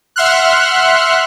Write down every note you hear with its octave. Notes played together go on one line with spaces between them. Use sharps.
E5 F#5 C6 F6 F#6